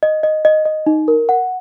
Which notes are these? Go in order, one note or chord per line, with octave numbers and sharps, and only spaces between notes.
D#5
D#5
D#5
D#5
D#4
A#4
F#5